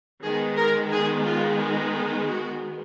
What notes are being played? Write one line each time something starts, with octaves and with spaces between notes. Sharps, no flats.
D#3 G#3 B3 G#4
A#4
G#4
F4
F#4